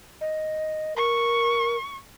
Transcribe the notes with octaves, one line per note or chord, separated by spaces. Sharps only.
D#5
A#4 C#6